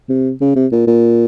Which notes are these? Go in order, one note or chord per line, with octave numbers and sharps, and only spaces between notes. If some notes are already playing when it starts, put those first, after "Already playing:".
C3
C#3
C3
A#2
A#2